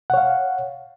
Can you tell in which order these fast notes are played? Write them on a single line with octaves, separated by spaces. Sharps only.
F#5 C#5 F5